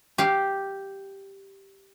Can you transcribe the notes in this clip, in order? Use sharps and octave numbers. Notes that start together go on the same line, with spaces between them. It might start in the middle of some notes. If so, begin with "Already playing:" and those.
G4 F5